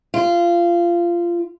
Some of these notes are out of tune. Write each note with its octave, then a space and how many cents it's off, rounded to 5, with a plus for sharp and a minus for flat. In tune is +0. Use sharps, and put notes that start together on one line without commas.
F4 -20